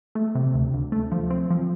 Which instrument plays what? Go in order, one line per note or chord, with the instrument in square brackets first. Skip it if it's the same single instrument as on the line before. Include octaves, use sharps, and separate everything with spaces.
[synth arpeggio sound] A3
C3
D2
D2
A3
F3
C4
F3